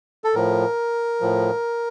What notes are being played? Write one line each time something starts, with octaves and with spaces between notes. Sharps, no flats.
A4
A2 F3 A#4
A2 F3